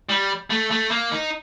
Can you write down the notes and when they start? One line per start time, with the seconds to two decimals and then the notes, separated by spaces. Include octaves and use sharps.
0.09 G3
0.50 A3
0.71 A3
0.91 A#3
1.12 D#4